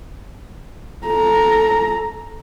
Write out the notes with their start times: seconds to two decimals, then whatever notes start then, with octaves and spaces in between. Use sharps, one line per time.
1.07 A4 A#5